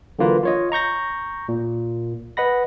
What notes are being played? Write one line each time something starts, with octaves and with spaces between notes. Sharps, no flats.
D3 E3 F#3 A#3 F4 B4
F4 C#5 D#5
A#5 C#6 G6 A#6
A#2
B4 D#5 F#5 B5 A#6